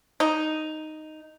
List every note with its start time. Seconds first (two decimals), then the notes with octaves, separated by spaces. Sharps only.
0.20 D#4